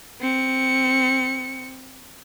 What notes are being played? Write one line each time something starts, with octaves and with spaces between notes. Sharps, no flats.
C4 C#7